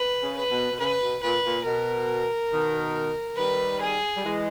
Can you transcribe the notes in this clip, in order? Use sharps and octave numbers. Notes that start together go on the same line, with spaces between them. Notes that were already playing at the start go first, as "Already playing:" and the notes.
Already playing: B4
C#3
B4
B2
B2
C#3 B4
B2
A#2 B4
A#2
B2 A#4
B2 D#3
D#3 G3 B4
G#4
G3
E3 G#3